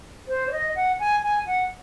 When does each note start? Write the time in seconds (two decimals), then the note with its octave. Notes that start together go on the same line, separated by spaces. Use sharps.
0.28 C5
0.47 C#5
0.52 D#5
0.76 F#5
0.99 G#5
1.23 G#5
1.47 F#5